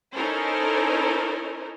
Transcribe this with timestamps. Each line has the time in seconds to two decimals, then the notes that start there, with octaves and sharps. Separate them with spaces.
0.16 C#4 D#4 E4 A4 A#4 C5